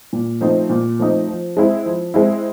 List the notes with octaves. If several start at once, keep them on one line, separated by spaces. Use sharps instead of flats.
A#2
F3 A3 C4 D#4
A#2
F3 A3 C4 D#4
F3
G#3 C4 E4
F3
G#3 C4 E4